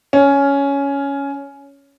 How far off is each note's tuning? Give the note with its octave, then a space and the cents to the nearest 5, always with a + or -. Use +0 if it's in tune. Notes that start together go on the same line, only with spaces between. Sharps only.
C#4 +10